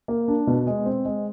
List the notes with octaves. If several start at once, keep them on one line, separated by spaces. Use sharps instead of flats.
A#3
D4
B2
G#3
C4
G#3